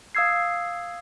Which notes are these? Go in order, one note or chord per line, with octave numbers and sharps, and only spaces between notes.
F5 D#6 E6 G#6 C7